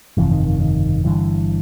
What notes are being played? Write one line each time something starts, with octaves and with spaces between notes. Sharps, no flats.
G1 F2 C3 E3
D#3
D#3
D#3
G1 G2 D3 E3